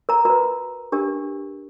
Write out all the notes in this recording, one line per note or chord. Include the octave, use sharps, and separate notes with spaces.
A#4 A#5
F#4 A#4 B4 A#5
D4 G4 A#4